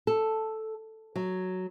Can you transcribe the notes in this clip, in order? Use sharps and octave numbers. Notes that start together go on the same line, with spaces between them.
A4
F#3